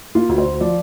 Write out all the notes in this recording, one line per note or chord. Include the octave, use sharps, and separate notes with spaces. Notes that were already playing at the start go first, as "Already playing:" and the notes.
A#3 F4
D2
C5
D2
F3 D5